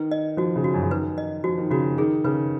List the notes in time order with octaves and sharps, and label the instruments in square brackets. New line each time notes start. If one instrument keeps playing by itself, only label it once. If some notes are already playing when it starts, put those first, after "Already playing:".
Already playing: [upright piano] D#3 [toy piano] B4
[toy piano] D#5
[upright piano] F3 [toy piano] F#4
[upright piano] C#3
[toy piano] F#4
[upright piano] F#2
C#3
[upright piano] D#3 [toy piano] B4
[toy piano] D#5
[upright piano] F3 [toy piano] F#4
[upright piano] D#3
[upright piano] C#3 [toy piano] F#4
[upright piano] D#3
[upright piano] D#3 [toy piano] G#4
[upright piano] C#3 [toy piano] B4